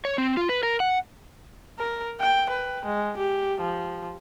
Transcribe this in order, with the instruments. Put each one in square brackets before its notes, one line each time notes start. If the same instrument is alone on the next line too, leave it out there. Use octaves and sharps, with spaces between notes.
[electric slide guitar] C#5
C4
F4
B4
A#4
F#5
[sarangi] A#4
G5
B4
G#3
G4
F3